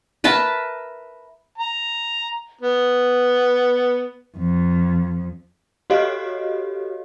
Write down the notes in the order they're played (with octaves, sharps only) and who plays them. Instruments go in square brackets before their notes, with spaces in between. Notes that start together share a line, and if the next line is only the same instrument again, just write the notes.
[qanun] A#4 B4 E5 A5
[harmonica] A#5
B3
[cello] F2
[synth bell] F#4 G4 A4 C#5 D#5 F5